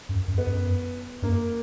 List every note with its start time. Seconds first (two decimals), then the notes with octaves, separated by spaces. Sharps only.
0.09 F#2
0.28 F#2
0.38 B3
0.47 F#2
1.22 F#2 A#3